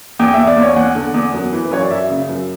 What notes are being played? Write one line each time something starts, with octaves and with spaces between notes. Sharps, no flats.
E2 G5
E2 E5
D5
E2
C#5
E2 F#5
D3
E2
F#2
E3
B4
F#2 C#5
D5
F#2 E5
C#3
F#2